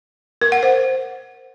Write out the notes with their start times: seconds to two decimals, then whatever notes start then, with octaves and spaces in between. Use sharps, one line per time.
0.41 A#4
0.52 F#5
0.63 C5